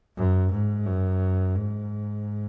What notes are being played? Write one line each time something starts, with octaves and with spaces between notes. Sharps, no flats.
F#2
G#2
F#2
G#2